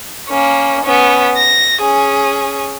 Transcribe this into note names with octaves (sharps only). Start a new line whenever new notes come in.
A#3 C#4
B3 C#4
A#6
C#4 G#4